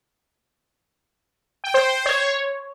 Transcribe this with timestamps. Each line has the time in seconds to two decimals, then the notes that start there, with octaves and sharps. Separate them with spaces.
1.64 G5
1.74 C5
1.85 C5
1.95 C5
2.06 C#5